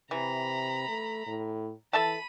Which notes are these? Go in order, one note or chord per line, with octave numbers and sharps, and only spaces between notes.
C3 E3 A#5 B5
A3
A2
E3 A4 E5 A5 B5 D#7